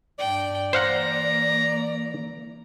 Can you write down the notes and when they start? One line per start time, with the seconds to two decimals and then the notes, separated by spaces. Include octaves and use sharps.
0.19 G2 D4 D5 G5
0.73 E3 A#3 C5 F5 F#5 A#5